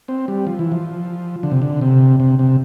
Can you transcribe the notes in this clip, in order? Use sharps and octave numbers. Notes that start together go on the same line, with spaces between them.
C4
G3
F3
E3
F3
D3
C3
D3
C3
C3
C3